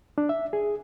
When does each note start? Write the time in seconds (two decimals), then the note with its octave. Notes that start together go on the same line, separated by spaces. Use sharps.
0.18 D4
0.29 E5
0.53 G#4